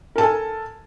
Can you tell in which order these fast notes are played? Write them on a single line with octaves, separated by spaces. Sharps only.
A#4 A5 A4 G#5